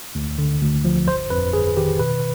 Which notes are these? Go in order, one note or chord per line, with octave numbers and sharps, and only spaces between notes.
D2
D3
D2
F3
G1 C5
F2 B4
G1 G#4
D#3 G4
B2 B4